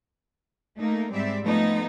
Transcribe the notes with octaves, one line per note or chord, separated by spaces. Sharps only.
A3 A#3 D#4 A#4
G#2 G3 G#3 C4 D5 E5
F3 A3 B3 D#4